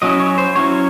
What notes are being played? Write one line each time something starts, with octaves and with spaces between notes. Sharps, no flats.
F#3 C#4 E4 D#5
C#5
C5
F#3 C#4 E4 C#5